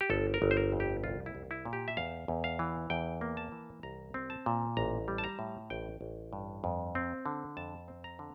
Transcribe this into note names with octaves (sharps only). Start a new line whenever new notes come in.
G4
G1 A4
A#4
G1
C5
A#4
F2
G4
C2 F4
E4
C2
E4
A#2
G4
E5
E2 F5
E2
F5
E3
E2 G5
A#3
A5
E3
C2 A#5
C4
A5
A#2
A1 A#5
G3
A5
A#5
A2
A1 G5
A1
G2
F2
C4
D3
F2 A5
C4
A#5
D3